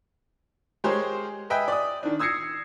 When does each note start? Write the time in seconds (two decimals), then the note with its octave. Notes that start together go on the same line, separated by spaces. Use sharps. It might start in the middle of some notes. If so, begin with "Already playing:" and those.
0.84 G#3 G4 G#4 A#4 C5 C#5
1.50 B4 D#5 E5 G5 G#5
1.68 D5 D#6
2.03 D#3 D4
2.19 D#6 E6 G#6 A#6 C7 C#7